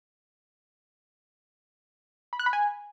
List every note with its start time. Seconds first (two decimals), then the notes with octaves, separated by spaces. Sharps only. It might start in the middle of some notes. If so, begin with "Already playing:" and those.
2.33 B5
2.39 F#6
2.46 B5
2.53 G#5